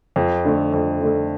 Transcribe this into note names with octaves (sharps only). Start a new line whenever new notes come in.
F2
D3 A3
F2
D3 A3